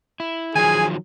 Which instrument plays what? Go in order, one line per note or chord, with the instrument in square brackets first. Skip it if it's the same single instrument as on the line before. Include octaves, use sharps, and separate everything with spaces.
[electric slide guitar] E4
[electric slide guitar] D#3 F3 F#3 [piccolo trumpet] G#4 [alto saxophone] G#5